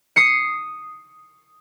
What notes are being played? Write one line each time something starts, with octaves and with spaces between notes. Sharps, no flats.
D#6 C7 C#7